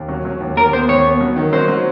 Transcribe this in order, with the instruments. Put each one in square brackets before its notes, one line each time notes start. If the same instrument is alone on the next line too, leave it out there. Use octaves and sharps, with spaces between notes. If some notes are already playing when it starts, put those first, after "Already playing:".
Already playing: [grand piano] D#2
F#3
F#3
D#2
[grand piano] D#2 [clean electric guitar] A#4
[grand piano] B3 [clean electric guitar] C5
[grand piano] D#2 [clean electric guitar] C#5
[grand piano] B3
F#3
D#3
[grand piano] F#3 [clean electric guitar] C5
[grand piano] F#3